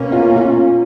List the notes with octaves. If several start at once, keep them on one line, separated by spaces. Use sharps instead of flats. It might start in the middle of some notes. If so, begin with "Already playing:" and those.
Already playing: B2 A#3 C#4
F4
F4